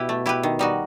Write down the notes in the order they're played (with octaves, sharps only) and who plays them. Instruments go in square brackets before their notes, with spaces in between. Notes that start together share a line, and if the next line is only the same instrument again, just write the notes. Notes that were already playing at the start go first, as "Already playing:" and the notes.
Already playing: [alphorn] B2 [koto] E4 G4 B4
[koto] A3
E4 G4 B4
D#3
G3 D#4 F#4